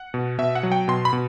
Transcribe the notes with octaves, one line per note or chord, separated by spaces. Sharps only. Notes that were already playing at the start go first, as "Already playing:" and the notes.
Already playing: F#5
B2
B2 E5
F#5
F#3
G5
B2 C6
B5
B2